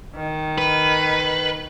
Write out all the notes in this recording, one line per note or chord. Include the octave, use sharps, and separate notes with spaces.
D#3
B4